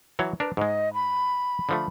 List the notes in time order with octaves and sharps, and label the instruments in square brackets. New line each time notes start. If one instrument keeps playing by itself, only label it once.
[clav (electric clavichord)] E3 F#3 C#5
[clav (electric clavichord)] D4 A#4 [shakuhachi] B4
[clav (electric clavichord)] G#2 G#3 [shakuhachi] D#5
[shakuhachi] B5
[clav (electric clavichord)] D3 F3 A3